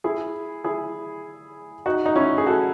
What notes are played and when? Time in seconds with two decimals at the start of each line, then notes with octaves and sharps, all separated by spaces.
0.04 E4 G#4
0.64 E4 G#4
1.86 D#4 F#4
2.06 D#4
2.16 C#4 E4
2.38 G#4
2.47 F#4 A4